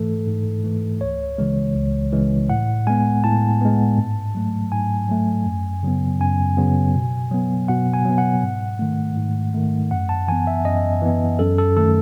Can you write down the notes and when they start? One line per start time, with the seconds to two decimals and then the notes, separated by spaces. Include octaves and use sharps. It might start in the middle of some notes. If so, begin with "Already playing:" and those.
Already playing: G#2 E3 A3 A4
0.27 G#2
0.64 E3 A3
1.01 C#2 C#5
1.38 C#3 E3 G#3
1.75 C#2
2.12 C#3 E3 G#3
2.50 A2 F#5
2.87 G#3 B3 G#5
3.24 A2 A5
3.61 G#3 B3
3.98 G#2
4.35 F#3 A3
4.72 G#2 G#5
5.09 F#3 A3
5.46 F#2
5.83 C#3 F#3 B3
6.20 F#2 G#5
6.57 C#3 F#3 B3
6.94 B2
7.31 F#3 B3
7.68 B2 F#5
7.94 G#5
8.05 F#3 B3
8.18 F#5
8.43 G#2
8.79 D#3 A3
9.17 G#2
9.54 D#3 A3
9.91 F#2 F#5
10.09 A5
10.28 E3 B3 G#5
10.47 E5
10.65 F#2 D#5
11.02 E3 B3
11.39 F#2 A4
11.58 A4
11.76 D#3 A3 A4